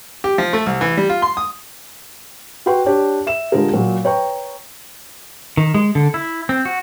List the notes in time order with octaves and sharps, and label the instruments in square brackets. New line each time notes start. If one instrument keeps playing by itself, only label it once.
[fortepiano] G4
F3
A3
C2
E3
G3
F4
C6
D#6
[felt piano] F#4 B4 F#5 G5 C6 C#6
D4 G4 C#5
E5 E7
D3 G#3 F4 G4 G#4 A#4
A#2 F#3
B4 C#5 G5 A#5 C#6
[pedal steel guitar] D#3
G#3
D3
E4
C4
F#4